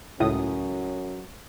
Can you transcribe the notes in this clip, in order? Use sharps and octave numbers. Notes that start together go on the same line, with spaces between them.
C#2 F#2 A2 F#3 C#4 D#6